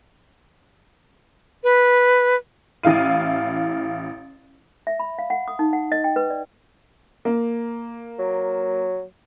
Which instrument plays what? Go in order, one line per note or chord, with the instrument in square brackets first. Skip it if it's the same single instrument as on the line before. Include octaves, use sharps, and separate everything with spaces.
[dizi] B4
[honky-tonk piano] A1 E4 F5 D#7
[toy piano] E5
B5
F5
F#5
D#6
D#4
F#5
D#5
G5
B4
D5
[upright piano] A#3
[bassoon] F#3